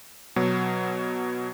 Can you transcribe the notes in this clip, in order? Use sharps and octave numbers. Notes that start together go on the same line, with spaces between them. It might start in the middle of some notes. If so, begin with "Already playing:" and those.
B2 F#3